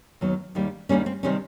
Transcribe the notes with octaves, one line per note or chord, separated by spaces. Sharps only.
D#2 D#3 F#3 B3
D#2 D#3 G3 A#3
D#2 D#3 G3 A#3 C#4
C4
C3 D#3 G3 C4 C#4